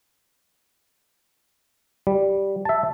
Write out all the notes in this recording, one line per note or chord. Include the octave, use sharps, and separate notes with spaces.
G3
E5 A5